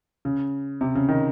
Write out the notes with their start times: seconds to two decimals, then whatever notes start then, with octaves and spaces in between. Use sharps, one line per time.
0.25 C#3
0.81 C3
0.95 C#3
1.09 D#3